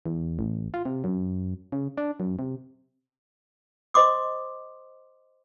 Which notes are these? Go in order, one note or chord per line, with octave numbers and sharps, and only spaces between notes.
E2
A1
F4
C3
F#2
C#3
D4
F#2
C3
C5 D#5 C6 D6 D#6